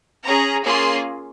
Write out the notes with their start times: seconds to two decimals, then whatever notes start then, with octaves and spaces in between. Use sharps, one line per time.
0.25 C#4 G#4 A#5
0.65 A#3 C#4 F4 G#4 C6